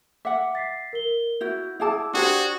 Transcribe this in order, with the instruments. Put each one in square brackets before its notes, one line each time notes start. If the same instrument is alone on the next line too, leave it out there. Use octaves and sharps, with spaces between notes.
[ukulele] E5 F#5 [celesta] D6
[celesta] A6 B6 C7
A#4 G7
[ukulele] E4 F#4 [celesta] G6
[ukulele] E4 G#4 A5 [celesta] F#5 D6 E6
[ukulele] D4 G4 C5 [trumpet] F#4 [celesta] D#6 G#6